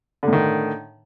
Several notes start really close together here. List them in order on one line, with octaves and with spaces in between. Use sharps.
D3 A2 D#3